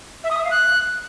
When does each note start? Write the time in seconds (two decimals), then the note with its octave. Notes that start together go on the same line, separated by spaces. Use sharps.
0.24 E5
0.31 D#6
0.37 E5
0.44 F5
0.51 F#6